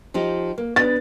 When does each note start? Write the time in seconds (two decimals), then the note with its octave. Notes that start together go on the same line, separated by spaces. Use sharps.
0.14 F3 D#4 G4
0.58 A#3
0.76 B3 D4 A6